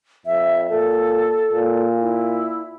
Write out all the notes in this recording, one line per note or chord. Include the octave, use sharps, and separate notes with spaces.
F2 E5
A#2 A4
A#2
E4